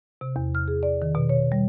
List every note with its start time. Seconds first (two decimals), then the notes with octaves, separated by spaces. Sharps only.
0.21 C3
0.36 E2
0.55 F6
0.68 G#4
0.83 D5
1.02 D#3
1.15 B2
1.29 C#5
1.52 G3